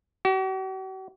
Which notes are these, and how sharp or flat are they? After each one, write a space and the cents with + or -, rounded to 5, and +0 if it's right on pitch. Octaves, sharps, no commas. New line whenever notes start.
F#4 +45